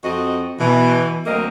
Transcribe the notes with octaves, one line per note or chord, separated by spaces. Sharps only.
F2 C4 F#4 D#5
B2 E3
D2 F#3 A#3 C4 A#4 D#5